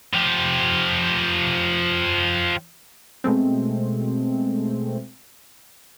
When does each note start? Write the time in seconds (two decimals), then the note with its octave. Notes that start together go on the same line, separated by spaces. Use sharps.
0.14 F3 G4
3.24 B2 G#3 A3 C4